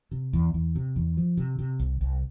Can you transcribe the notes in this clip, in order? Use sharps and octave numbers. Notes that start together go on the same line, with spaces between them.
C3
E2
E2
C3
E2
F3
C3
C3
C2
C2